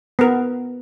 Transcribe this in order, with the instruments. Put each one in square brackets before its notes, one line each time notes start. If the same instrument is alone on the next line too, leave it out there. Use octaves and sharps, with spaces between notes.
[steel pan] B3 A#4